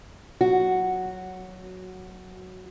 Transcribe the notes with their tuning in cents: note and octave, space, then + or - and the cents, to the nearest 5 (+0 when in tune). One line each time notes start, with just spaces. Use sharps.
F#3 +0 F#4 +0